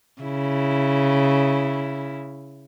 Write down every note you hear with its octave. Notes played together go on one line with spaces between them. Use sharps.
C#3 E4